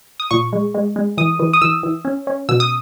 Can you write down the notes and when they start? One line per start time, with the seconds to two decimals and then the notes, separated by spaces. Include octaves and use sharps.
0.20 D#6
0.31 A#2 C#6
0.53 G#3
0.75 G#3
0.96 G#3
1.17 E3 D#6
1.39 E3
1.53 D#6
1.62 E3 E6
1.83 E3
2.05 C#4
2.27 C#4
2.49 B2 E6
2.60 D#6